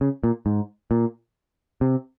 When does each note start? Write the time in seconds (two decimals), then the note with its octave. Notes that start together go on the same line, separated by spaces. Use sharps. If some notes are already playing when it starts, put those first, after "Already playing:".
0.01 C#3
0.24 A#2
0.46 G#2
0.91 A#2
1.81 C3